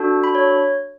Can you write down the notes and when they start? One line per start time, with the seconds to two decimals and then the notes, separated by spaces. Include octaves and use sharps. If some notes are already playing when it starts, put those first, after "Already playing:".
Already playing: D4 F#4 A4
0.24 B5
0.35 C#5